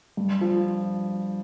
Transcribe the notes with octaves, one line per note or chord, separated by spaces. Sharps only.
G2
F3